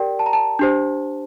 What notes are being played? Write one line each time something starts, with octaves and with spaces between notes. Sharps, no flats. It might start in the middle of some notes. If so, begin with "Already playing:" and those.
Already playing: G4 A#4 D5 G5
A5
A#5
A5
D4 G4 C5